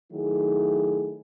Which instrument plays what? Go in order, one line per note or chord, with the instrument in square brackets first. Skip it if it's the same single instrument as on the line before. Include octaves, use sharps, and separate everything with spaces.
[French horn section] D#3 F#3 A3 E4 G#4